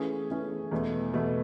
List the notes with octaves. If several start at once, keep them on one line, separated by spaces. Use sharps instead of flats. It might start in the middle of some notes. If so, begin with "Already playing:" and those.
Already playing: E3 A3 C#4 G#4
E3 A3 C#4 G#4
E2 B2 A3
E2 B2 A3